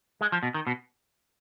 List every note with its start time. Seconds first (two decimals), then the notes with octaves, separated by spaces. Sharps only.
0.21 G#3
0.32 F3
0.43 B2
0.54 D#3
0.67 B2